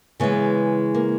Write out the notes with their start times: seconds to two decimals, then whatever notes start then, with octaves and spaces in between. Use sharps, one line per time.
0.20 C#3 E3 G#3 B3
0.94 A#3